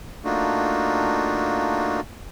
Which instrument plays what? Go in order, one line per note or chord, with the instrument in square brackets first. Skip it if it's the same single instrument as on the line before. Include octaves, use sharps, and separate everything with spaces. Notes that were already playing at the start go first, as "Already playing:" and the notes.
[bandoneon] A3 A#3 D4 D#4 F4 F#4